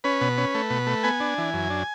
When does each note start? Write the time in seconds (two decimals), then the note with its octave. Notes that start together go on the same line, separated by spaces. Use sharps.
0.04 C#4 B4
0.21 B2
0.38 C#4
0.55 A3
0.70 B2
0.87 A3
1.03 B3 G#5
1.20 D4
1.38 E3
1.53 F#2
1.70 D4